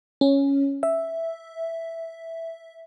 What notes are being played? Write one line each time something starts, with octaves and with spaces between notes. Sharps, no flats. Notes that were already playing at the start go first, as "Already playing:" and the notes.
C#4
E5